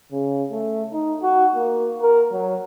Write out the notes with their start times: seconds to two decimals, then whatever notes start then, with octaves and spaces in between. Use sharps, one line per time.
0.12 C#3
0.52 A3
0.93 D#4
1.23 F#4
1.56 A#3
2.02 A#4
2.32 F#3